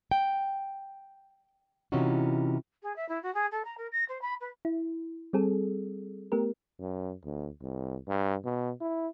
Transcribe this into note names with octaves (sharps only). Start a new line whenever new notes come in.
G5
C3 E3 C#4 D#4 F4 F#4
G#4
E5
E4
F#4
G#4
A4
A#5
A#4
A#6
C5
B5
B4
E4
G3 C4 G#4 A4
A3 B3 G4 A#4
F#2
D2
C2
G2
B2
E4